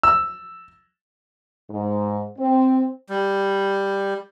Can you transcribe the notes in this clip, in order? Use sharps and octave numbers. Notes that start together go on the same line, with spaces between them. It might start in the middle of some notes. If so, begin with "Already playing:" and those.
E6
G#2
C4
G3